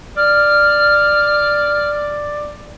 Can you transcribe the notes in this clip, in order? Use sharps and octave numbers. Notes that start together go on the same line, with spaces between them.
D5 F6